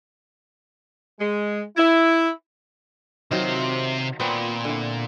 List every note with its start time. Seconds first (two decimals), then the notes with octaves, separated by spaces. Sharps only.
1.20 G#3
1.77 E4
3.31 C3 D#3 F#3 F4 C5
4.20 A#2 B3 C4 B4
4.65 D3 E4